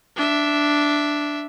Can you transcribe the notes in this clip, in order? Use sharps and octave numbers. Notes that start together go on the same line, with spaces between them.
D4 E5